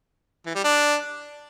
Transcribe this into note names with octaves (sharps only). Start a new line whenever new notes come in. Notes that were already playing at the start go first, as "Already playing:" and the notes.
E3
G3
D4